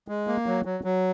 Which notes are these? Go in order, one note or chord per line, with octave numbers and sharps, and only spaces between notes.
G#3
A#3
F#3
F#3
F#3